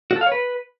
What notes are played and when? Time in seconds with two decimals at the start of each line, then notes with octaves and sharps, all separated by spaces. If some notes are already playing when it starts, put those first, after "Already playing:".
0.11 F#4
0.16 A4
0.21 F5
0.26 C#5
0.32 B4